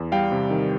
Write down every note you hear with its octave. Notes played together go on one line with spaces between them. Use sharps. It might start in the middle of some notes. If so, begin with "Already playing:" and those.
Already playing: E2
G3 F5 G5
C3
D#3